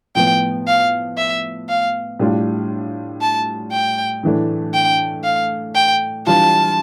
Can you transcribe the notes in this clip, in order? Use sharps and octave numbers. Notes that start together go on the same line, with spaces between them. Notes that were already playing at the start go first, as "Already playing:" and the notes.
A2 F3 B3 G5
F5
E5
F5
A2 G3 D4 F4
A5
G5
A2 E3 A3 D4
G5
F5
G5
E3 G3 D4 F4 A5